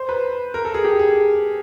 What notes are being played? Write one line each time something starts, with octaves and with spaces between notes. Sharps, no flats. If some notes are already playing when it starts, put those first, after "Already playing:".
Already playing: C5
B4
A#4
A4
G#4
G4
G#4